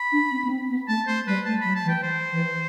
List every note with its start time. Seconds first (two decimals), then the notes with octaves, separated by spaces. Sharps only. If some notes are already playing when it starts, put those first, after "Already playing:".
Already playing: B5
0.12 D4
0.31 C4
0.45 B3
0.50 C4
0.69 B3
0.88 A3 A5
1.07 A3 C5
1.27 G3 B4
1.45 A3 A5
1.61 F#3 B5
1.75 A5
1.85 E3
1.89 G5
2.03 C5
2.32 E3